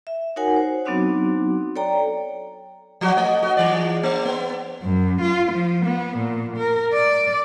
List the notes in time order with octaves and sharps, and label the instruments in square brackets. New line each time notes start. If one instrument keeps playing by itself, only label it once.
[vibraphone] E5
D#4 F#4 A#4 C#5 F#5 G#5
C5
F#3 B3 C4 D4 D#4 F#4
A4 C#5 D5 G5 A#5
[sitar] F3 F#3 F#4
A3 D#5
F#4 D#5
E3 G#3 D5
A#3
B3
[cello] F#2
F4
F3
B3
A#2
A#4
D5